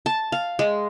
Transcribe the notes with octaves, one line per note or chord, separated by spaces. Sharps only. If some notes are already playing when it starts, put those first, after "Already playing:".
A5
F5
G#3